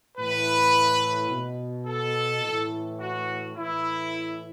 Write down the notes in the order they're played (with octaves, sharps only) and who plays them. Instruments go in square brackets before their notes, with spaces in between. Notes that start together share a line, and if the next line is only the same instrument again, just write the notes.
[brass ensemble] A2 E3 B4
B2
A4
A2 E3
F#4
A2 E3 E4